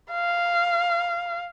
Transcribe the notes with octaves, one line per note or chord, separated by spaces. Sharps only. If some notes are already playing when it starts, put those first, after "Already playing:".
F5